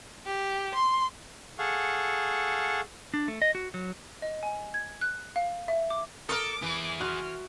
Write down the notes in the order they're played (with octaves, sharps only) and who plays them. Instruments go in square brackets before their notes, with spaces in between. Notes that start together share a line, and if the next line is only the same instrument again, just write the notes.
[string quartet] G4
C6
[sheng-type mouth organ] G#4 A4 F5 F#5 C#6
[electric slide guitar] D4
A3
D#5
F#4
F#3
[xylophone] D#5
G#5
G#6
F#6
F5
E5
D6
[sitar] A4 A#4 [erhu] D6 [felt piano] D#6 F6
[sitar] E3 [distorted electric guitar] E4 G#4
[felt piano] F#4 C6 F#6 [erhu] F6